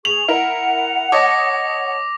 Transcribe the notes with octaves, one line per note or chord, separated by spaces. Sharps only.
G#4 C#6 F7 F#7
E4 A#4 F#5
C#5 D#5 A5 D6 A#6